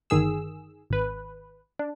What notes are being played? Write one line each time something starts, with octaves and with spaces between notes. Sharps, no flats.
G1 D#3 G#4 E6
G#1 B4
D4